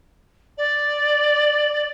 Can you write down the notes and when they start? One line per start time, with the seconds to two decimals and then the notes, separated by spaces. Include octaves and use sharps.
0.58 D5